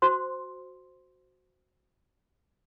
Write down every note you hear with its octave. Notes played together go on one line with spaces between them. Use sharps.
F#4 C5 C6